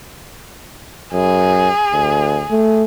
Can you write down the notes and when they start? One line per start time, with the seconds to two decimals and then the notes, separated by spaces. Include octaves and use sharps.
1.13 F#2 G#4
1.93 D2
2.51 A3